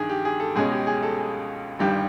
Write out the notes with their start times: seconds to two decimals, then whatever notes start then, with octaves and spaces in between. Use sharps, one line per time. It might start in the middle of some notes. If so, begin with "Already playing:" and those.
Already playing: G2 D#3 G#4
0.09 G4
0.25 G#4
0.40 A4
0.56 C#2 B2 G#3 C#4 G#4
0.72 G4
0.87 G#4
1.03 A4
1.18 G#4
1.79 G1 G2 D#3 G3 G4